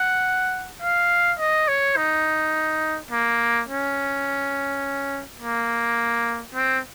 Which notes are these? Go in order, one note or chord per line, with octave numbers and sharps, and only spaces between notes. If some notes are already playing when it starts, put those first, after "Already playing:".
Already playing: F#5
F5
D#5
C#5
D#4
A#3
C#4
A#3
C4